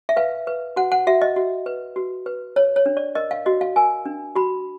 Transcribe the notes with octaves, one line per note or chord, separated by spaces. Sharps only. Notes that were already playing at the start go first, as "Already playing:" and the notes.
E5
B4 F5
B4
F#4 F#5
F#5
F#4 E5
D#5
F#4
B4
F#4
B4
C#5
C#5
D4
D5
A#4 D#5
F5
F#4 D#5
F5
A#4 G#5
D4
F#4 B5